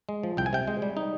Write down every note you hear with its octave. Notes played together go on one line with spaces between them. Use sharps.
G#3
F3
C2 G5
G#5
C3 G5
G#3
G3
D#4